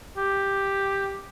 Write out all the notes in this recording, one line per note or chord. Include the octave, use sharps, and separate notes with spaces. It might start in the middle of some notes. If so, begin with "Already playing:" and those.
G4